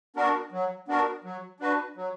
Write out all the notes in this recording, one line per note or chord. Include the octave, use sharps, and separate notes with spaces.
B3 D4 F#4 A#4
F#3
B3 D4 F#4 A#4
F#3
D4 F#4 B4
F#3